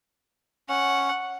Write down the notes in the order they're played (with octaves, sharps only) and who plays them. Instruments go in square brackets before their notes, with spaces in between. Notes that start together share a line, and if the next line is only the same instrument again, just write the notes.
[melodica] C#4 [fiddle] F#5